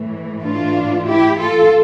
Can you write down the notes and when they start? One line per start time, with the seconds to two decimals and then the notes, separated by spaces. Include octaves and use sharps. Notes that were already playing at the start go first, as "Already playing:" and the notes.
Already playing: A2 E3
0.43 D4 F4
1.07 E4 G4
1.39 F4 A4